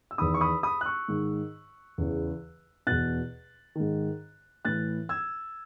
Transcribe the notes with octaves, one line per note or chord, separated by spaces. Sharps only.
E6
E2 D#3 B5 D#6
C#6
B5 D#6
B5 D#6
F#6
C#6 E6
G#2 D#3
E2 C#3 E3
E2 B2 F#6 A6
G#2 D#3
A2 E3 F#6 A6
E6 G#6